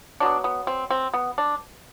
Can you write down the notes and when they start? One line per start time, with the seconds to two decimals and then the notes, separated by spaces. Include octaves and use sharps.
0.20 B2 F#3 B3 D4
0.44 B3
0.67 C4
0.90 C4
1.14 B3
1.38 D4